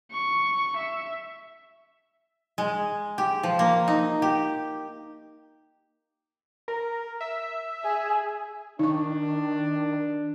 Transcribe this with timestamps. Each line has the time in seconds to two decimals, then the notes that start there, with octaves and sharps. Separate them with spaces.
0.12 C#6
0.77 E5
2.58 G#3
3.18 G4
3.43 F3
3.59 A#3
3.88 D#4
4.22 G4
6.68 A#4
7.20 E5
7.84 G#4
8.79 D#3 D4 D#4 C#6